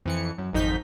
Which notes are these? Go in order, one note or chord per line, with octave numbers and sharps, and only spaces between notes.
F2 E3 C#7
F#2
G#1 F2 D#4 G6 B6